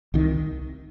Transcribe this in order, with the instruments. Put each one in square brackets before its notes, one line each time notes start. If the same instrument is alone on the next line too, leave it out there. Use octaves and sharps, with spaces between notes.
[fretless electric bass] C2 C3 D#3